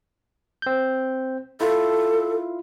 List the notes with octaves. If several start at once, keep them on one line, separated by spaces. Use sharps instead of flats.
C4 G6
E4 F4 A4